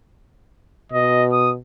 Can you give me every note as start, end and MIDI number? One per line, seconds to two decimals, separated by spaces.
0.92 1.57 47
0.92 1.25 75
1.32 1.51 87